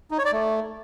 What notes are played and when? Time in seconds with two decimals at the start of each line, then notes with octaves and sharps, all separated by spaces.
0.11 D#4
0.18 C#5
0.25 D5
0.32 A3